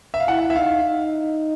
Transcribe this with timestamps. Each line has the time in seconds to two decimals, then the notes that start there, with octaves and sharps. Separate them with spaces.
0.14 E5
0.20 F5
0.28 E4 F#5
0.50 E5
0.56 D#4 F5
0.84 D#4